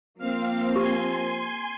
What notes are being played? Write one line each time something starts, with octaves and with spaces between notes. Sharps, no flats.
F3 A#3 C4 F5
G4 G#5 C6